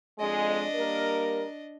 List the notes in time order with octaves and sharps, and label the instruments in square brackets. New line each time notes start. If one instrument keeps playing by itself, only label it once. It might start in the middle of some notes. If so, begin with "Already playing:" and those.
[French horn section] F2 G#3 [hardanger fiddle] D4 D#5
[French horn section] G3 A#3 A#4